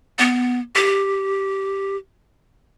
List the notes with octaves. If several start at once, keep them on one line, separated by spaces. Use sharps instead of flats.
B3
G4